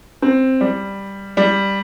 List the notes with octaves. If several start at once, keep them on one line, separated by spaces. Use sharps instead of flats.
C4
G3
G3